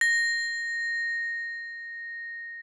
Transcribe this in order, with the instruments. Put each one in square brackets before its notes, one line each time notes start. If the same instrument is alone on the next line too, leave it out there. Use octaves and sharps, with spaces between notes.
[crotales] A#6